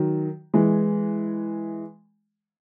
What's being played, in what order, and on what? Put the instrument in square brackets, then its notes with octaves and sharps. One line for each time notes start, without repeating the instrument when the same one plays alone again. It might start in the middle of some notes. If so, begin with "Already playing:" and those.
Already playing: [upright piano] D#3 F#3
E3 G#3